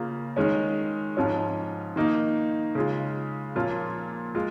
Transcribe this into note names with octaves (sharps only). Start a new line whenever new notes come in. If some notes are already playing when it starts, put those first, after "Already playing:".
Already playing: C#3 A#3 F4
D#3 G#3 C#4
G#2 F3 C#4 F4
D#3 A#3 D#4
C#3 G#3 F4
A#2 F3 A#3 C#4 F4
G#3 F4